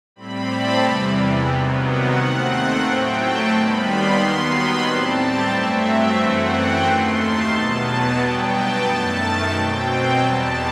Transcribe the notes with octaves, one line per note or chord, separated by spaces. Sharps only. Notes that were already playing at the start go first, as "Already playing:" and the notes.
A2 G3 C4 B5
A5
E2 C3 E3 G3
C3 D#3 F#3 B3
F#5
D#2 D#3 A3 C4
F#5
A2 F#3 A3 C4 G5
A5
D#2 D#3 G3 B3 B5
C6
D#2 D#3 F#3 B3
B5
A2 G3 C4 A5
G5
G2 F#3 A3 C4 E5
E5
F#2 E3 A3 C4 F#5
G5
D#2 D#3 A3 C6
A5
E2 B2 F#3 B3 A5
A5
G2 F#3 B3 G5
A5
F#2 D#3 A3
A5
B2 F#3 C4 G5
E2 B2 G3 A5